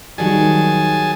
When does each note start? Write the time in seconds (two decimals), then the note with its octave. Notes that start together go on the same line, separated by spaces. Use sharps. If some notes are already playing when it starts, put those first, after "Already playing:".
0.18 D#3 F#3 G3 G#4 G#5 A5